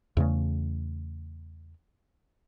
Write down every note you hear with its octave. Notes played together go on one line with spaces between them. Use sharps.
E2 C#3 A3